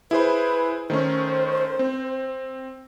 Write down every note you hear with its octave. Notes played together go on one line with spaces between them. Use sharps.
E4 G#4 B4 C5
D#3 A3 C#4 C5
C4